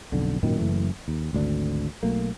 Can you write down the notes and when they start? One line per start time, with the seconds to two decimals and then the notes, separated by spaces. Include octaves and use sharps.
0.12 B1 F2 D3
0.43 G#1 F#2 A#2 D#3
0.58 F#1 F#2 E3 A3
1.08 D#2
1.33 G#1 D2 D4
2.03 B1 F#3 A3 A#3